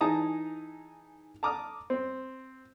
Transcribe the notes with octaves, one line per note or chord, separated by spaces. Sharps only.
E3 D#4 G#4 A5 A#5 D#6
A5 A#5 D6 D#6 F6
C4